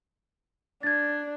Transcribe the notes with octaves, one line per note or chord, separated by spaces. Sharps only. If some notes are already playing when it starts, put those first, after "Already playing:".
D4 G#6 A6